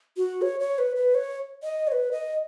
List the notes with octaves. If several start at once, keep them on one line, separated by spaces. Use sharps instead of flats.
F#4
C#5
C#5
B4
B4
C#5
D#5
C#5
B4
D#5